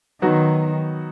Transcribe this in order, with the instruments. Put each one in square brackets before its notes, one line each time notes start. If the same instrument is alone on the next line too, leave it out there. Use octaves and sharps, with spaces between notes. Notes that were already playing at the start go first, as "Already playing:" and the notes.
[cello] D#3 [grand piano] F#3 B3 D#4 F#4